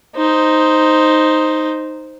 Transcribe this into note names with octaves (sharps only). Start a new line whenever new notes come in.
D#4 C5